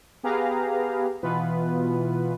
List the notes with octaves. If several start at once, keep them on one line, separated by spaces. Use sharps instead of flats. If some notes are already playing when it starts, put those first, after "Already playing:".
B3 G4 G#4 B4 F5 A#5
B2 E3 B3 F4 B4